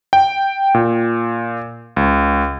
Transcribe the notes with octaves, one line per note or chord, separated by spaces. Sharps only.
G5
A#2
C#2